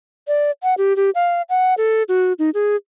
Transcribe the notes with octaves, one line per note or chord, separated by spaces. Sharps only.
D5
F#5
G4
G4
F5
F#5
A4
F#4
D#4
G#4